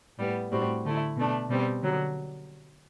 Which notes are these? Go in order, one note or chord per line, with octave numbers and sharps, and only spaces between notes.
A2 G3 B3
A2 G3 C4 F#4
D3 A3 E4
B2 A3 D4
B2 G3 C4
D3 F#3